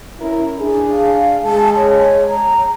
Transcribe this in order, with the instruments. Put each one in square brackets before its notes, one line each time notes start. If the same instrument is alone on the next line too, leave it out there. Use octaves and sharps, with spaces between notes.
[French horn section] C#4 E4 A#4
D4 G#4
[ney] F5
[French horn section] G#3 G#4 [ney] A5
[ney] C#5
A#5